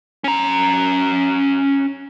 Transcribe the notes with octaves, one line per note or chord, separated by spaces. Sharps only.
C#4 A#5